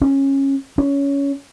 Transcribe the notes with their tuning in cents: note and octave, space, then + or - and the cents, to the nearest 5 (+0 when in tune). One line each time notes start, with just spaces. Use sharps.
C#4 -20
C#4 +15